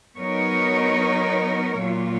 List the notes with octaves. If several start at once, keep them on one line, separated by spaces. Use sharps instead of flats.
F#3 B3 D#4 A#4 C#5
A#2 F#3 A#3 F4